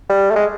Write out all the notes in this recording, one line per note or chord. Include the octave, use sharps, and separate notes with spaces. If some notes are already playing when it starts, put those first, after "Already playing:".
G3
A3
G#3